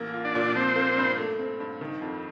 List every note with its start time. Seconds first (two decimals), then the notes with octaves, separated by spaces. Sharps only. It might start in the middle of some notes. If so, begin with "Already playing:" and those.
Already playing: A1 A#3
0.14 F4
0.25 D4 D5
0.35 A#2
0.55 F3 C4 C5
0.76 A#3
0.98 G2
1.18 A3
1.39 C4
1.60 G2
1.81 D#3
2.02 F2